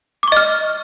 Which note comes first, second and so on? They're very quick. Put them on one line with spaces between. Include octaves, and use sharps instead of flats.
D6 C#6 D#5 F6